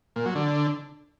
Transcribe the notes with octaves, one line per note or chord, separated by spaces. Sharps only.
A#2
F#3
D3